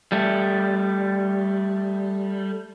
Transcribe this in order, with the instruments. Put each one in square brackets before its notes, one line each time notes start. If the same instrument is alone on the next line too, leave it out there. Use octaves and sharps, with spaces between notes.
[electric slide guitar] G3 A3